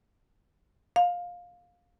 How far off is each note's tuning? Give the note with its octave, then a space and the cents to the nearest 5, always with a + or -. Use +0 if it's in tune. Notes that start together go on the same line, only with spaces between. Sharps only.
F5 +15